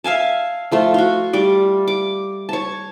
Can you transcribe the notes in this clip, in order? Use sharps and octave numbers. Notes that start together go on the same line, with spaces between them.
E5 F5 G#5 A5
F3 A3 F4
F4 F#4
G3 D5
D6
C#5 A5